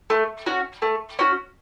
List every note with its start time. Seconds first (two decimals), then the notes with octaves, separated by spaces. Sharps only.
0.10 A3
0.46 C#4 F#4
0.82 A3
1.19 C#4 F#4